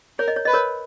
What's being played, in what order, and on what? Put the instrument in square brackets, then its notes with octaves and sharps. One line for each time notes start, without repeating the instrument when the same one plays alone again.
[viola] A#4 [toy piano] C#5
[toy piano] D#5
C#5
[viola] B4 [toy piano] D#5
[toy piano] A#4 C#5